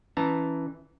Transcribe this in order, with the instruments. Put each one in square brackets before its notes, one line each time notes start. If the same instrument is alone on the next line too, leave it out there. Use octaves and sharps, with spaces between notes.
[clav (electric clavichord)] E3 A5 A#5 [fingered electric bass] C#4